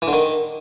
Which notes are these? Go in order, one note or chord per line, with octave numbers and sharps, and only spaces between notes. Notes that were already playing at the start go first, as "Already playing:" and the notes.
E3
D3
D#3